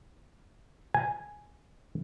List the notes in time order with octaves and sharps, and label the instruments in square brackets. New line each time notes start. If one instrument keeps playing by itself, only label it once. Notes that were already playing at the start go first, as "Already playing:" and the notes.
[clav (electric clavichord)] G#5